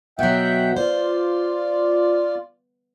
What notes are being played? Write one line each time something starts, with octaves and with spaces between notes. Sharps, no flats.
B2 F#3 E5 F#5 G5
F4 C5 D5